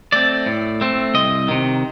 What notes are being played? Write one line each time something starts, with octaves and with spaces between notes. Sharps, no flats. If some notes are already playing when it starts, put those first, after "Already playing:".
A3 C4 D5
A2
A3 C4
C2 D#5
C3 D#3